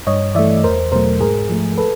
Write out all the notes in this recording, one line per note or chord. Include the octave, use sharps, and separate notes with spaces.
G2 C#5 D#5
E3 A3 D5 E5
E2 A#4 C5
B2 F#3 A3 A#4 C5
G#2 G#4 A#4
F3 A3
A4 B4